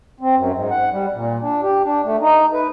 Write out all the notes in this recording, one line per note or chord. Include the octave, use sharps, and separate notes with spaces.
C4
F#2
G#2
F#5
G3
A#2
D4
G4
D4
A3
D#4
B4